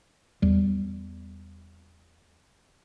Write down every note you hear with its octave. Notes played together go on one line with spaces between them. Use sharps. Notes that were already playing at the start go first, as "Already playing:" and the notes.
E2 G3